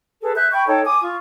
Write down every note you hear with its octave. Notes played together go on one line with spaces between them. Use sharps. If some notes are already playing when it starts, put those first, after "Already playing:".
G#4 A4 B4
E5 F#6 G6
G5 B5 C#6 G6
D#4 A4 C#5 G5
G#5 D6 D#6
F4 C#6